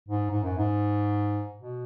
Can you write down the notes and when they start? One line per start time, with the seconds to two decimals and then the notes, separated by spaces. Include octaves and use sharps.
0.08 G#2
0.30 G#2
0.43 F#2
0.58 G#2
1.57 B2